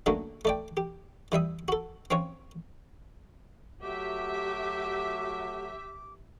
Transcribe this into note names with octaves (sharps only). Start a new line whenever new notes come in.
D3 F#3 A3 A#3 C#4
A3 D5 G5
G4
E3 G3 E5 D#6
F#4 A4
C4 C#4 F4 C#5
F#3 A3 F#4 G4 E5 D6